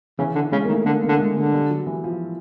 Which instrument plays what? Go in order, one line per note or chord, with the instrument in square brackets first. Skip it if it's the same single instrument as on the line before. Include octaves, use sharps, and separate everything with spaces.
[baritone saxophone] C#3 [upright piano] E3
[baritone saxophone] D3
[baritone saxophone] C#3 [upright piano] G#3
[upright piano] A#3
[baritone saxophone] D#3 [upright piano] A3
[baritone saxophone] D3 [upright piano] A#3
[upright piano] A#3
[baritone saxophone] D3
[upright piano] G#3
[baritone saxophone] D3
[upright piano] G#3
G3
F#3
E3
F3